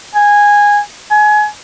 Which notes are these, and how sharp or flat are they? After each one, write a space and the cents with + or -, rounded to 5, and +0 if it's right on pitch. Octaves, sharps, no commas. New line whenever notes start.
G#5 -10
G#5 +25